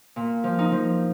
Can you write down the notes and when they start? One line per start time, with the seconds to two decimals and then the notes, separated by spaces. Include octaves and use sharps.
0.16 A#2
0.44 F3
0.59 D#4
0.72 F3